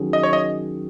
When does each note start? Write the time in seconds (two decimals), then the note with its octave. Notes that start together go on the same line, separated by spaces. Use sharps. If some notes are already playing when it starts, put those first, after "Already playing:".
Already playing: D#3 F#3 C#4 G#4
0.13 D#5
0.23 C#5
0.33 D#5